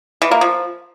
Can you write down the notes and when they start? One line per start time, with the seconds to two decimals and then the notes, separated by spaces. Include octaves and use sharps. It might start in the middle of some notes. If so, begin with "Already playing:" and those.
0.22 E3
0.31 A#3
0.41 F3